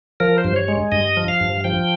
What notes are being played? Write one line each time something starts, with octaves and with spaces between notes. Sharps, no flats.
F3 A#4
C5
G2
C#5
G#3
G2 D#5
F3
F5
G2
F3 G5